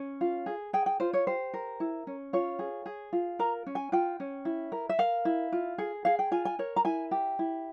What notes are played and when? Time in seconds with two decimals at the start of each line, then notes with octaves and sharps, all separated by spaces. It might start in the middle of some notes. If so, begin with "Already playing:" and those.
Already playing: C#4
0.21 F4
0.46 G#4
0.73 G#4 G5
0.86 G5
1.00 F4 C5
1.13 C#5
1.27 G4 C5
1.54 A#4
1.80 E4
2.07 C#4
2.33 F4 C#5
2.59 G#4
2.86 G#4
3.13 F4
3.39 A#4 A#5
3.67 C#4
3.75 G#5
3.92 F4 G5
4.20 C#4
4.45 E4
4.72 A#4
4.89 E5
4.99 A#4 F5
5.25 E4
5.52 F4
5.78 G#4
6.05 G#4 F5
6.19 G5
6.31 F4 G#5
6.45 G#5
6.59 A#4 C#5
6.76 A#5
6.85 E4 G#5
7.11 G4
7.39 E4